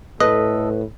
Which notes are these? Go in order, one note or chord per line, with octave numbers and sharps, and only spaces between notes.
A2 A4 B4 D#5